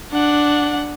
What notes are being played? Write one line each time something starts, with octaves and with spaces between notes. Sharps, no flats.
D4 F#5